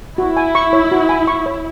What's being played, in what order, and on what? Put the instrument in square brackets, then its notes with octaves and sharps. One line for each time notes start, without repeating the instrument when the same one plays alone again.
[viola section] E4 [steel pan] F#4
[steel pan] G#5
C#6
C#5
F#4
G#5
C#6
C#5